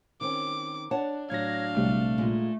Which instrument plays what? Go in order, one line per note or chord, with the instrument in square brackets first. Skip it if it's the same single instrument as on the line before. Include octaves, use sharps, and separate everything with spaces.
[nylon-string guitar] D#3 C4 C#4 [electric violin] D6
[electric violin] D4 [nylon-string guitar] C#5 F#5 A5
[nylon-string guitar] A2 F#3 F#4 [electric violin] D4 F5 [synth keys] G#6 A#6
[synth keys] A#1 C3 G3 [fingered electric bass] A3
[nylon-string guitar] A#2 G#3